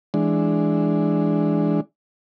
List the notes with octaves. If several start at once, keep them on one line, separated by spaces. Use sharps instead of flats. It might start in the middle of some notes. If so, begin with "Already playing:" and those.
E3 G#3 D4